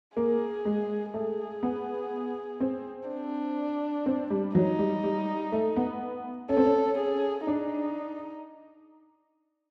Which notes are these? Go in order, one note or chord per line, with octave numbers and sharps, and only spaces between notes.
A#3 G#4
G#3
A3 G#4
B3
C4
D4
C4
G3
F#3 D#4
G3
G3
A3
B3
C#4 A4
C4
C#4
G#4
D4 D#4